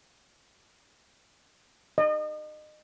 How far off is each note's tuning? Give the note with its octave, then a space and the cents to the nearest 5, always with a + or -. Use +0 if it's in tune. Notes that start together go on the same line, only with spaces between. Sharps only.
D#5 -30